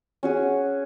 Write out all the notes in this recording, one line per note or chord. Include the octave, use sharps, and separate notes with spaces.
C#4 F#4 G#4